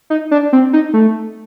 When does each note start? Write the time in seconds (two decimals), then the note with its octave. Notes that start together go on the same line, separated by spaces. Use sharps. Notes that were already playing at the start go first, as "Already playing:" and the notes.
0.10 D#4
0.31 D4
0.53 C4
0.73 D#4
0.94 A3